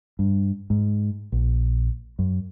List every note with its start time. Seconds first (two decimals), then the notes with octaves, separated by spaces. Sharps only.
0.19 G2
0.70 G#2
1.32 A#1
2.19 F#2